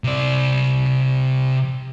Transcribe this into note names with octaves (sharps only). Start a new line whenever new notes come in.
C3 D5